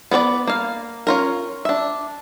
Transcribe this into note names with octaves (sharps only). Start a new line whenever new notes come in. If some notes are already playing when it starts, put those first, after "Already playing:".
B3 B4 C#5 D5
A#3 F5
C#4 F4 A#4
D4 E5